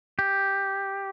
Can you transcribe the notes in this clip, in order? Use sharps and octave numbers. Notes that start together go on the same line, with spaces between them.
G4